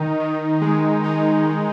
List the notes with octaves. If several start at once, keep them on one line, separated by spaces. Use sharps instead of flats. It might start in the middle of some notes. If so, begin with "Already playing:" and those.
Already playing: D#3 D#4
D#3
G#3
D#4
D#3